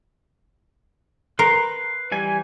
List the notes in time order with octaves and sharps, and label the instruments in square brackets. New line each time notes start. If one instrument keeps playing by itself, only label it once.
[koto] A#4 [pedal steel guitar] B4 C6
[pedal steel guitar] E3 G3 G#5